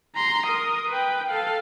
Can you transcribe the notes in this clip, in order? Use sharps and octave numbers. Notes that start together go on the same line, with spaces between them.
A#5 C6
A#4 D#6
B4 G5
A4 F5